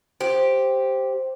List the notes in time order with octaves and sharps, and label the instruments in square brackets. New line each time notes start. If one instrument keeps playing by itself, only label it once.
[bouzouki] G4 [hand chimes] C5